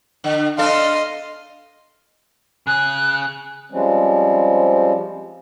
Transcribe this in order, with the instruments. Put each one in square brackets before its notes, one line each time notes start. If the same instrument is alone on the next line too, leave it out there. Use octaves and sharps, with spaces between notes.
[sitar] D3
[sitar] D4 A4 [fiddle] D#5 C6 [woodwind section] F5
[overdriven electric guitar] C#3 G#4 [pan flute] F#6
[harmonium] F3 G3 G#3 C4 C#4